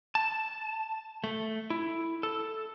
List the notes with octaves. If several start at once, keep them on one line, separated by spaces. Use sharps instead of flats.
A5
A3
E4
A4